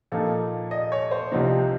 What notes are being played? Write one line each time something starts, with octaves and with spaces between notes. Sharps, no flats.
A#2 F3 A#3 D#4 A4
D#5
C#5
C5
C2 C3 F3 C4 D#4